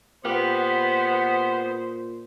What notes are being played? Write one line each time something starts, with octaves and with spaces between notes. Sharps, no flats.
A#2 B3 G4 B4 C5 F5